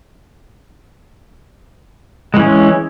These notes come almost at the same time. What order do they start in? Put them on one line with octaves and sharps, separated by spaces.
G#3 E3 C#4